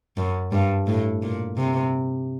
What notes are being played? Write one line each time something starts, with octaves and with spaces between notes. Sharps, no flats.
F#2
G2
A2
A#2
C3